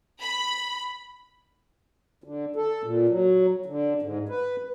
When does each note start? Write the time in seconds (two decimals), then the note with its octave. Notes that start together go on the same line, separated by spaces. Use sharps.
0.21 B5
2.24 D3
2.56 A4
2.84 A#2
3.09 F#3
3.66 D3
4.02 G#2
4.29 B4